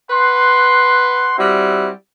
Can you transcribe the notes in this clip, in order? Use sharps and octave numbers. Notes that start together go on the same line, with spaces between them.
B4 F#5 C6
G3 C4 E4 F#4